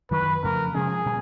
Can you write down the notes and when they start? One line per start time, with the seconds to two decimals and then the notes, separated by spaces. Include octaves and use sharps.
0.11 F#2 D#3 F#3 B4
0.43 F2 C#3 F3 A3 A#4
0.74 C3 F3 G#3 C#4 G#4
1.06 A#2 G3